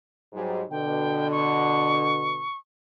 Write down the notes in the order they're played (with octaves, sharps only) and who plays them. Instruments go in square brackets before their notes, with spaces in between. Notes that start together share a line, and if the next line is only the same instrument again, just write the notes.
[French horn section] G#2 F#3 G3
[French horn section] B2 D3 [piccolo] G5
[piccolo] C#6